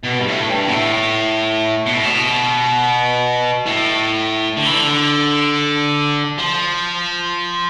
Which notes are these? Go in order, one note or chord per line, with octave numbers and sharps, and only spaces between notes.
B2
G2
A2
G2
B2
A2
B2
A2
B2
A2
D3
E3
D3
F3